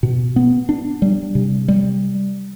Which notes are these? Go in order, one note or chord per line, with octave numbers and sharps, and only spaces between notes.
B2
B3
D4
G3
C3
G3